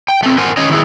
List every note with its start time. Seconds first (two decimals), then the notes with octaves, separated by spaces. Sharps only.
0.08 G5
0.23 A3 C4
0.38 A#4 C5 F#5 G#5
0.57 D#3 C#4 C#5 D#5
0.70 D#3 E4 G#4